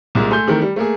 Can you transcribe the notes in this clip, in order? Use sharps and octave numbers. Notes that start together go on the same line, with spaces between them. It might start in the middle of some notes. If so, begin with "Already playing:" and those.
C2 A#2 G#3
A3 G#5 C6 G6
D#3 E3 A3 C4 A#4
G3
A3 A#3 G#4